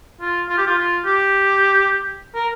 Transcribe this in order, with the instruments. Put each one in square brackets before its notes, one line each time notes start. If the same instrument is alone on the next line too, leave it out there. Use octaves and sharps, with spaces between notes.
[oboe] F4
F4
G4
F4
F4
G4
A#4